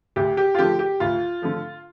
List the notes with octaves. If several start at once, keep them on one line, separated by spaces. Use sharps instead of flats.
D2 G4
G4
F4
D3 F3 A3 G4
G4
D2 F4
D3 F3 A3